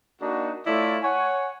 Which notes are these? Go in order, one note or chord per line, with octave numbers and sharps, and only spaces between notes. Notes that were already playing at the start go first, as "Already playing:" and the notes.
A#3 D4 D#4 F#4
A3 E4 F4 A4 C#5 D5
C#5 F#5 G#5